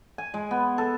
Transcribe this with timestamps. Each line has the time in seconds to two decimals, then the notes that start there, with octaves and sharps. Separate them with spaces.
0.18 G#5
0.34 G#3
0.51 B3
0.78 A4